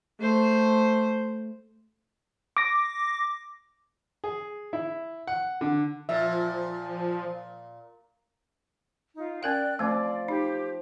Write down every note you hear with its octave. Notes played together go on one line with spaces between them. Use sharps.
A3 C5
D6 A#6
G#4
E4
F#5
D3
A#2 F3 E5
D#4 F4
C#4 A#4 D5 F5 G5 F#6
F3 A3 C4 D5 D6
D#4 G4